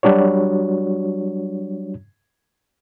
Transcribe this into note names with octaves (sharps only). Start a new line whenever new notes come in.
F#3 G3 D4 F#4 C#5